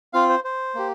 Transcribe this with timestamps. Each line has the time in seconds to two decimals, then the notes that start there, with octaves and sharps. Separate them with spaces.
0.13 C4 F4 F5
0.29 C5
0.44 C5
0.75 A#3 G4